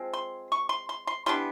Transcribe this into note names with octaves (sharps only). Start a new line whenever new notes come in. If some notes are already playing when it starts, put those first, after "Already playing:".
Already playing: F3 G#3 C4
C6
C#6
C6
C6
C6
E3 G3 B3 D4 C6